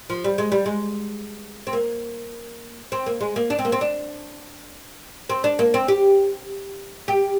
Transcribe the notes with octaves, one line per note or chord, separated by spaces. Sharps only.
F3
G3
G#3
G3
G#3
C4
A#3
C4
A#3
G#3
A#3
D4
C4
A#3
C4
D4
C4
D4
A#3
C4
G4
G4